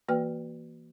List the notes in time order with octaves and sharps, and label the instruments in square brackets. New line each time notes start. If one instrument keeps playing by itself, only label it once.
[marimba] E3 A#3 F#4 B4 G5 F6